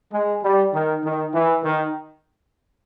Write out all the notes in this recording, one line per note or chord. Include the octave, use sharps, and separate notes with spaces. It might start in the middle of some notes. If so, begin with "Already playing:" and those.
G#3
G3
D#3
D#3
E3
D#3